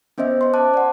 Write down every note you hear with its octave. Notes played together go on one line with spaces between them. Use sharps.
B3 C#4 C5 D#5 E5
C5 C6
A5 D6 F#6
D5 F#5